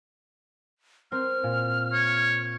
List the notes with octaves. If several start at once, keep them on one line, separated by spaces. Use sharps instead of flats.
C4 A#4 C5 F6
A#2
C#5